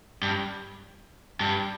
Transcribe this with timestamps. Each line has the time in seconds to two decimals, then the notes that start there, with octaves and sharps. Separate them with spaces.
0.22 G2
1.40 G2